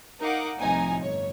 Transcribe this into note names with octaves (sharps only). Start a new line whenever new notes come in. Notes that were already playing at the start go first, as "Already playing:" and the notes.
D#4 A#4 F5 F#5 D6
C2 A2 C3 F3 D#4 G#5
G1 C#5